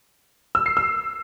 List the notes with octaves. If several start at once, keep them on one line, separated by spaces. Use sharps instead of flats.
E6
C7
E6